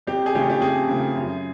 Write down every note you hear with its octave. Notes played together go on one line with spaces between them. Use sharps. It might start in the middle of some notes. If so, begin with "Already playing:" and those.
F2 G4
G#4
C#3 F3 A3 G4
G4
F2 G#4
C#3 F3 A3
F#2